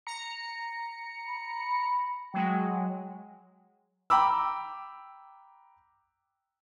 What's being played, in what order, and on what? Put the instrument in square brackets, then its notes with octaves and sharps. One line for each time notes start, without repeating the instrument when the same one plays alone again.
[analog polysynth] A#5 C#7
[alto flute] B5
[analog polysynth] F#3 G#3 [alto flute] G5
[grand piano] G5 A#5 B5 D6 E6